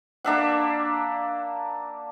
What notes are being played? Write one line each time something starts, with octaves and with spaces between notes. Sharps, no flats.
A#3 D4 E5 F#5